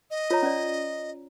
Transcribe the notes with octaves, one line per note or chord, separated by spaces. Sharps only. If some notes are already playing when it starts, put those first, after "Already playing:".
D#5
F4 C#5 A#5
C#4 D5